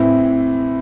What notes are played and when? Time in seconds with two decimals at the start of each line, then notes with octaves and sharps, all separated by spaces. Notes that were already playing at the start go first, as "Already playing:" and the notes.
Already playing: A2 E3 C4 E4